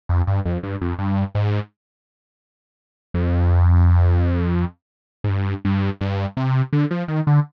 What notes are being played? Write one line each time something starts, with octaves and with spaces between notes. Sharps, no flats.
F2
G2
F2
G2
F2
G2
G#2
F2
G#2
G2
G2
G2
C3
D3
F3
D#3
D3